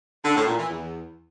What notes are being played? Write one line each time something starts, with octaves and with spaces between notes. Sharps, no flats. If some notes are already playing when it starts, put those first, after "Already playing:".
D3
A2
A#2
E3
E2